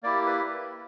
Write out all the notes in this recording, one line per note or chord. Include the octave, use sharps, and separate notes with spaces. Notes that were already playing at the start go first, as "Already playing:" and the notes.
A#3 E4 G4 D5
B4